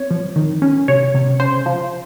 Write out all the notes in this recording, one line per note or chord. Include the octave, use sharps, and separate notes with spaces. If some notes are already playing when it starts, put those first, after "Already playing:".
Already playing: C4 C#5
F3
D#3
C#4
C3 C#5
C3
C#3 C5
F3